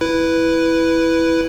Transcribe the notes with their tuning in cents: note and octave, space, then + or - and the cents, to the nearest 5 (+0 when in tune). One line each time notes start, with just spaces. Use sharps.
E4 +0 B4 +0